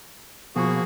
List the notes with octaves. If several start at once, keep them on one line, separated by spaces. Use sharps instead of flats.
B2 F3 A#3 F#4 G#4